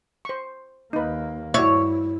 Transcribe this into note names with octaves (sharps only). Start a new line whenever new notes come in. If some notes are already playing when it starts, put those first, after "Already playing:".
C5 C#6
D#2 A#3 D#4 B4
G2 E4 F#4 C#5 D5 E5